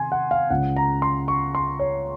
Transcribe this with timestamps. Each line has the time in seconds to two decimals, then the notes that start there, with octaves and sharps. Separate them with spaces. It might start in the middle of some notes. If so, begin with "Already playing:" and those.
Already playing: C3 D#3 G#5 C6
0.12 F#5
0.31 F5
0.50 C#2 C#3 F#5
0.76 A#5
1.02 C6
1.28 C#6
1.55 C6
1.79 C#5